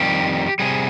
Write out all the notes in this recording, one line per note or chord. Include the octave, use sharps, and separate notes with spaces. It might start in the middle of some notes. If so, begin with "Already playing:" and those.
Already playing: F2 D#3 G3 G4
C3 G3 G#4